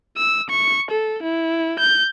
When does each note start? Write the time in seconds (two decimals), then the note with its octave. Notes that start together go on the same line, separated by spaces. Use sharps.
0.17 E6
0.50 C#6
0.91 A4
1.23 E4
1.79 G6